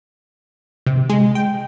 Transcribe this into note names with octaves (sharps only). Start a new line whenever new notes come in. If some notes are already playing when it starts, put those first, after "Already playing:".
C3
G#3
G5